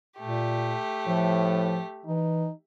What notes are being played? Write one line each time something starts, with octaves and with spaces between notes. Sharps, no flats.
A#2 A3 G4
A2 F3
E3 D#4